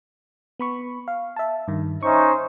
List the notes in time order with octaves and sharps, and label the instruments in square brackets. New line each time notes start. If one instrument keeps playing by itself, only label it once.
[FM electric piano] B3 B5 C#6
F5
E5 A5
G2 D#3
[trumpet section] C#4 D#4 C5 [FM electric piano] E5 C#6